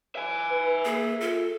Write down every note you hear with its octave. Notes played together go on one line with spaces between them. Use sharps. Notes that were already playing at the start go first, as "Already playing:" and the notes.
E5 G#5
B4
A#3 G#4
F4 A4